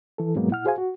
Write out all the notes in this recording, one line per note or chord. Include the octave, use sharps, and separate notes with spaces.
E3 A4
G#2 B2 F#3 G#3 A#3 B3
A#2 E4 F#5 F6
F#4 G#4 C5 F5 G#5
F#4